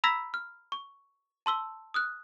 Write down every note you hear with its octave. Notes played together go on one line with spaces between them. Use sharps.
A#5 B5 E6 G#6 A#6 B6
F6
C#6
A5 C6 E6 G7
D#6 F6 F#6